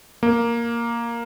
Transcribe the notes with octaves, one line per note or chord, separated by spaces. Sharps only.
A#3